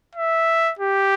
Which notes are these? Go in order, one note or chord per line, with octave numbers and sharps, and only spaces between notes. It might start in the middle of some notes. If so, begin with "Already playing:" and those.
E5
G4